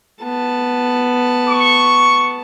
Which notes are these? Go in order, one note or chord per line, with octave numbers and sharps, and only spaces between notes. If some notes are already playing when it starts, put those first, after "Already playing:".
B3 A5
C#6